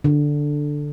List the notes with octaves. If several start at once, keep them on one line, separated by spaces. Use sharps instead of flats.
D3